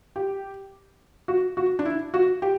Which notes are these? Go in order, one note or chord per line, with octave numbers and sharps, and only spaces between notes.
G4
F#4
F#4
D4
E4
F#4
G4